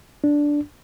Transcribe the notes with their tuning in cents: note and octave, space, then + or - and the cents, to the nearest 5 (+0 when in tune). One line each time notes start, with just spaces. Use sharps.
D4 -5